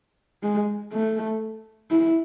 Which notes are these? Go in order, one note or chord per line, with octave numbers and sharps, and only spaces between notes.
G#3
A3
E4